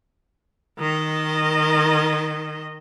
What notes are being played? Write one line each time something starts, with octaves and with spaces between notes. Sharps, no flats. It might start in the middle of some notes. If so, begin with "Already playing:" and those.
D#3 D#5